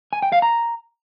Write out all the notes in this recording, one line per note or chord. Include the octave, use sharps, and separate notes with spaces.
G#5
G5
F5
A#5